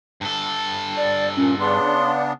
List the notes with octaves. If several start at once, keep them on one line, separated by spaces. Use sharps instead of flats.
G2 A4
D5
A#2 C#4
C#3 B3 D4 C6